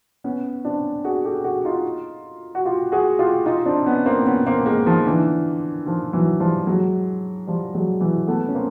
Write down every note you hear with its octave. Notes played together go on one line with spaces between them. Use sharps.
B3 C#4
C4 D4
F#4 G#4
G4 A4
F#4 G#4
D#4 F4
F#4
F4 G4
F#4 G#4
F4 G4
D#4 F4
C4 D4
B3 C#4
A#3 C4
B3 C#4
A#3 C4
G#3 A#3
D#3 F3
D3 E3
D#3 F3
E3 F#3
F3 G3
F#3 G#3
F3 G3
F#3 G#3
E3 F#3
A3 B3
C#4
A#3 C4